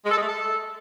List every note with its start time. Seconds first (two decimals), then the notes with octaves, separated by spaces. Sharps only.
0.04 G#3
0.10 A4
0.16 G#3
0.22 A3
0.28 A4